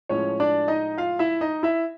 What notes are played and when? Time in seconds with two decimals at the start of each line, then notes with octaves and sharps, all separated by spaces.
0.09 A2 F3 G#3 C#4 C#5
0.40 D4 D5
0.68 D#4 D#5
0.98 F4 F5
1.19 E4 E5
1.41 D#4 D#5
1.63 E4 E5